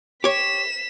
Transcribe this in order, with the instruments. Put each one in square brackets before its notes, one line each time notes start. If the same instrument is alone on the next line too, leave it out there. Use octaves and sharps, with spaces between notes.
[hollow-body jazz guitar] G4 C#5 [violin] B6 E7